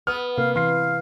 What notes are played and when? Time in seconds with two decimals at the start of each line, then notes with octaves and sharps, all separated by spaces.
0.07 B3 D#6 F6
0.38 C3 A#3 F5
0.56 E3 F5 C6 C7